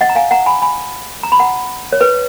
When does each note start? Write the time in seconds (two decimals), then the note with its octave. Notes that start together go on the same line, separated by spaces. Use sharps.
0.01 D#5 F#5
0.09 A#5
0.15 F5 G#5
0.31 F#5 A#5
0.46 G#5 B5
0.62 G#5 B5
1.23 A#5
1.32 B5
1.39 F#5 A#5
1.93 C#5
2.01 B4